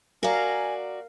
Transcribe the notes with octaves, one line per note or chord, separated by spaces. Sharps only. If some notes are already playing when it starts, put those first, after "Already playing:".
F#4 A#4 D5 F5 G#5